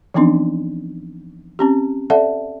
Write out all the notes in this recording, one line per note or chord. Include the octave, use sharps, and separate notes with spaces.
E3 F3 B3 C4 D4 D#4
C4 C#4 G4
A4 D5 E5 F#5 A5